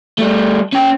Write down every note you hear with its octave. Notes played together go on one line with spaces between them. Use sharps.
G3 A3
C#4 G5